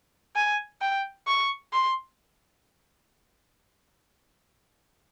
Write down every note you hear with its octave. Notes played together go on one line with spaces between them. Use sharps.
G#5
G5
C#6
C6